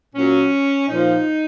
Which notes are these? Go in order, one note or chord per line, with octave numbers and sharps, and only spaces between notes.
A#2 F#3 C#4
A#2 F3 D#4